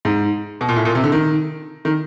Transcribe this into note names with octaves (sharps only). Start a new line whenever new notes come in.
G#2
B2
A#2
A2
A#2
C3
D3
D#3
D#3